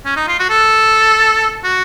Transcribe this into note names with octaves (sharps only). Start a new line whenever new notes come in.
C#4
D#4
F4
F#4
A4
F#4